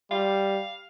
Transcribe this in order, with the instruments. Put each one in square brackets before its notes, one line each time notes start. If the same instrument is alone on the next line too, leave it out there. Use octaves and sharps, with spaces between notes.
[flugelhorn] G3 [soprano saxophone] F5